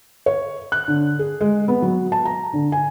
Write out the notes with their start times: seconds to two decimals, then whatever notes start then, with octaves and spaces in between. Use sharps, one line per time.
0.26 C#5
0.72 F#6
0.88 D3
1.19 G#4
1.41 G#3
1.68 B3
1.82 F#3
2.12 A5
2.25 A#5
2.53 D3
2.72 G#5